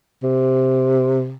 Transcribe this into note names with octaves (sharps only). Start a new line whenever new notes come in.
C3